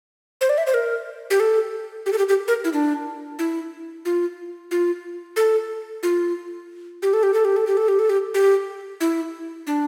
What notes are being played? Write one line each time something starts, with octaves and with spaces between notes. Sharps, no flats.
C5
D5
E5
C5
A#4
G4
A4
G4
A4
G4
G4
A#4
E4
D4
E4
F4
F4
A4
F4
G4
A4
G4
A4
G4
A4
G4
A4
G4
A4
G4
G4
E4
D4